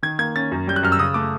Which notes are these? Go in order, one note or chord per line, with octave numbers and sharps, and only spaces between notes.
D#3 G#6
A#3 G#6
C#4 A6
F#2
G3 G6
F#6
F#2 F6
E6
C#3 D#6
A3 D6